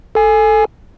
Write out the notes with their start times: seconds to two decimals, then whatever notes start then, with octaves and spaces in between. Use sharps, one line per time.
0.15 A4 G#5